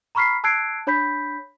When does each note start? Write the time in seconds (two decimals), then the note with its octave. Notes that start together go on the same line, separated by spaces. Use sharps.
0.15 A#5 B5 C#6 F6 B6 C7
0.44 A5 E6 F#6 G#6 C7 D7
0.87 D4 C#5 B5 G6 B6